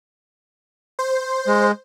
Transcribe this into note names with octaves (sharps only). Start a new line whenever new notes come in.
C5
G#3